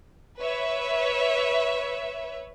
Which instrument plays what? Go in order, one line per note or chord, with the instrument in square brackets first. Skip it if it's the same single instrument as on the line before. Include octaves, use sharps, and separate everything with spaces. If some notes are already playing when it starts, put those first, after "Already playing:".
[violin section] B4 C#5 E5